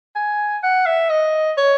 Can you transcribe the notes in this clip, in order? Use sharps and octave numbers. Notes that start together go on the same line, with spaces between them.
G#5
F#5
E5
D#5
C#5